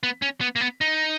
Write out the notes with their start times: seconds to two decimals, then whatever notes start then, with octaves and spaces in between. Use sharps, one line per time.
0.03 B3
0.22 C#4
0.41 B3
0.56 A#3
0.61 B3
0.81 D#4